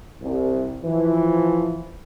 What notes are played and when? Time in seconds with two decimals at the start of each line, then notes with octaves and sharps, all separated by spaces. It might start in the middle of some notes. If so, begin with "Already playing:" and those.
0.21 C2
0.84 E3 F3